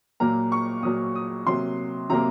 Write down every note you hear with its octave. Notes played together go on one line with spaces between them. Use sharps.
A#2 F#3 A#3 A#5
C#6
A#2 F#3 A#3 D#6
D#6
C3 F#3 A#3 C6
C3 F#3 A#3 A#5